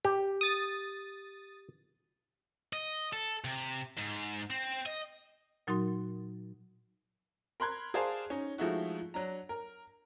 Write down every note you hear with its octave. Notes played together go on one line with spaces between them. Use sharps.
G4
D#6 A6
D#5
A4
C3
G#2
C4
D#5
A#2 F#3 D#4 F#4 A#4 C6
A#4 B5 C6 F#6 G#6
G#4 A#4 C5 D5 F5 A5
C#4 D#4
F3 G#3 A3 D#4 E4 F#4
F#3 D4 A#5
A#4